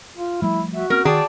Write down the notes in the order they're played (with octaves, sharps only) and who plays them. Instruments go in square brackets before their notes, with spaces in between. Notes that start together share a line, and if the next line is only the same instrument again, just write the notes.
[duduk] F4
[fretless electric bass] F3 G3 A3 [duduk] E4
[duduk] F#4 [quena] E5
[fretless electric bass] A#3 C4 C#4 [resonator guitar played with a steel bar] A#4 [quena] F6
[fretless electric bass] D#3 [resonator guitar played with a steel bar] G#4 G5 A5 [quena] D5